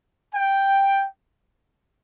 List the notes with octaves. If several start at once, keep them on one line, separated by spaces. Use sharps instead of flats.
G5